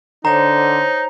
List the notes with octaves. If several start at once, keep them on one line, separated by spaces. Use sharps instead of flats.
D3 D#4 C5 C#5 A#5